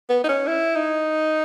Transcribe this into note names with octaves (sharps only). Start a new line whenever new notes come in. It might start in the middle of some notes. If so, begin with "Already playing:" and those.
B3
D#4
C#4
E4
D#4